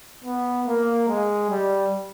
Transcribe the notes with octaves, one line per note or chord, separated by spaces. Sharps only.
B3
A#3
G#3
G3